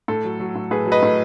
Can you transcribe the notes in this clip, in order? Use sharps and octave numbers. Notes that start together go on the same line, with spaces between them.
A2 A4
F#3
F#3
A2
A2 G#4 B4
F#3
B4 D#5
A2